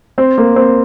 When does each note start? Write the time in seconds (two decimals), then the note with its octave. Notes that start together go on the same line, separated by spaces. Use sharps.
0.18 C4
0.38 A#3
0.56 C4